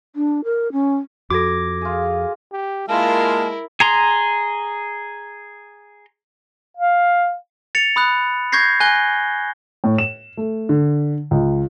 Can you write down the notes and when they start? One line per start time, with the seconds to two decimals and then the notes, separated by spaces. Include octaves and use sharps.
0.16 D4
0.44 A#4
0.72 C#4
1.30 F2 F#4 A4 D6 G#6 A#6
1.81 F4 G#4
2.52 G4
2.89 G#3 A#3 E4 F4 A#4 F5 A5
3.80 G#4 A#5 C6
6.77 F5
7.75 A6 C#7 F7
7.96 B5 D#6 F#6
8.52 C#6 G6 G#6 A#6 C7
8.80 G#5 F#6 A#6 G7
9.84 A2
9.98 E7
10.37 A3
10.69 D3
11.31 C#2